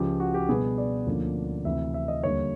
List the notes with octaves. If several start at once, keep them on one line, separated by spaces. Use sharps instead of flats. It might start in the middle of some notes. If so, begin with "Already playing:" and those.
Already playing: C#2 C#3 F3 G4
F#4
G4
B2 G3 B3 D4 G#4
D5
D2 D3 F3 A#3 C#4
D2 C3 E3 E5
E5
D#5
D#2 D3 G3 C#5